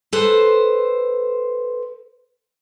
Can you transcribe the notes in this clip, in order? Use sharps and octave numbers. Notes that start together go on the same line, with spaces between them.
A4 B4 C5